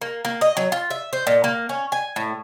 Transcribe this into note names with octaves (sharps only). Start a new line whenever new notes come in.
A#3
A#3
D#5
F#3
F4
E5
C5
A#2
A#3
C#4
G#5
A2